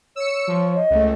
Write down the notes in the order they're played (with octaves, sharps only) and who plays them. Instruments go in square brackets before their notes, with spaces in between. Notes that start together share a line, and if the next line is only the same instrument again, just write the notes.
[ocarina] C#5 [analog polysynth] E6 C#7
[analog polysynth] F3
[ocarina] D#5
[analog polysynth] C#2 A3